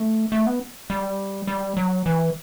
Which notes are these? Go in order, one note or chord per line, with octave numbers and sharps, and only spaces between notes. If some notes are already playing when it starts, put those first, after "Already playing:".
Already playing: A3
A3
B3
G3
G3
F#3
E3